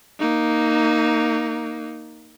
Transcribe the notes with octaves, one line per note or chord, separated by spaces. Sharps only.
A#3 D#4